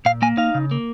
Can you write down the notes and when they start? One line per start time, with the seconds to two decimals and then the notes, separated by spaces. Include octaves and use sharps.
0.05 A#2 F5
0.22 A#3 G#5
0.37 D#4 F5
0.55 C#3
0.71 A#3